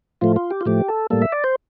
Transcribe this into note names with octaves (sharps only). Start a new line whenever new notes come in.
A2 F3 A3 F4
F4
G4
F4
A2 F3 A3 G4
A4
A2 G3 A#3 A4
E5
D5
C5